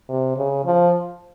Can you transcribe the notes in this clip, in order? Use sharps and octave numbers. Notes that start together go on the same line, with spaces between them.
C3
C#3
F3